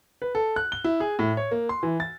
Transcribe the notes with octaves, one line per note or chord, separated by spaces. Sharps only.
B4
A4
F#6
G7
E4
G#4
A2
C#5
A#3
C6
E3
A6